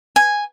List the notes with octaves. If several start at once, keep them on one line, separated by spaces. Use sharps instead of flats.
G#5